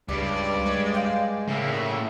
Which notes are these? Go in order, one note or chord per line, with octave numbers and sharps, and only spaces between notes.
C#2 G2 G4 D5
G#3 C#5
F5 G5
A2 C#3 A#3 E5